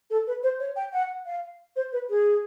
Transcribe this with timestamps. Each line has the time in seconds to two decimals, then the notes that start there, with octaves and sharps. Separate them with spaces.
0.10 A4
0.27 B4
0.43 C5
0.60 C#5
0.76 G5
0.93 F#5
1.26 F5
1.76 C5
1.93 B4
2.10 G#4